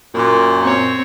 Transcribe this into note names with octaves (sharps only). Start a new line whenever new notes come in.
F#2 A#2
C4 C#5